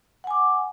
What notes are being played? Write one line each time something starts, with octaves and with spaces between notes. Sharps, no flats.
F#5 G#5 D6